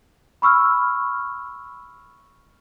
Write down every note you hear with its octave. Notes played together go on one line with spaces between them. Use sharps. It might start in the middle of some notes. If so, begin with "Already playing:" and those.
B5 C#6 E6 F6